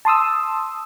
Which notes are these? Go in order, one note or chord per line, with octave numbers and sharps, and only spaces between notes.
A5 C6 D#6 E6